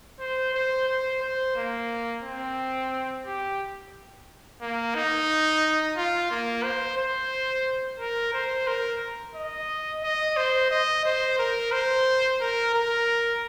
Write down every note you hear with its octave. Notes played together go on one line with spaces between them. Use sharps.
C5
C5
C5
C5
A#3
C4
G4
A#3
D#4
F4
A#3
C5
C5
A#4
C5
A#4
D#5
D#5
C5
D#5
C5
A#4
C5
A#4
A#4